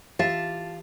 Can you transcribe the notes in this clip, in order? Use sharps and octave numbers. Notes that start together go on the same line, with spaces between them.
E3 F4 G4 E5 A5